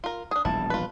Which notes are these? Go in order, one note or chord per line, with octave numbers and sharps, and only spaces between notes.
F4 A#4
D4 G#4 D#6
E1 A#1 G3 E4 A5
F4 B4